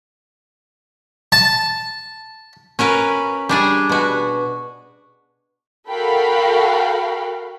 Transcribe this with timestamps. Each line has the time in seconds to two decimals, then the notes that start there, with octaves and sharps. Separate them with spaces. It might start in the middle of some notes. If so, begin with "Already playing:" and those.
1.32 A5
2.79 C#4 F#4 A#4 B4
3.49 G3 D4 G#4
3.89 B2 F#4
5.89 F#4 A4 A#4 F5 G5 B5